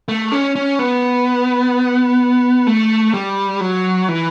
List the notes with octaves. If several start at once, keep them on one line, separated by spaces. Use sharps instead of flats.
A3
C#4
C#4
B3
A3
G3
F#3
E3